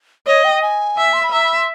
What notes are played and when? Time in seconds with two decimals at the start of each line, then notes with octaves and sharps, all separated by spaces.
0.27 C#5 D#5
0.44 G5
0.62 G#5
0.97 E5
1.13 C6
1.23 B5
1.32 E5 A#5
1.44 B5
1.56 C6